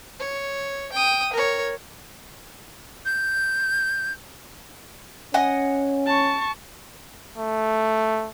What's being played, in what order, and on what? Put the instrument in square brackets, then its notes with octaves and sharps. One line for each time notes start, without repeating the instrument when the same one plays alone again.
[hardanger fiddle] C#5
G5 D#6
A#4 C#5
[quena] G6
[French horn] C#4 [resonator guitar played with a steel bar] D#5 F#5 G#5
[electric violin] A5 C#6
[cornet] A3